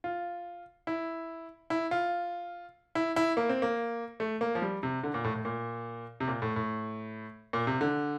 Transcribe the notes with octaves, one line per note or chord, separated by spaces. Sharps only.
F4
E4
E4
F4
E4
E4
A#3
C4
A#3
A3
A#3
F3
G3
C3
D3
A#2
A2
A2
A#2
C3
A#2
A2
A2
A#2
C3
D3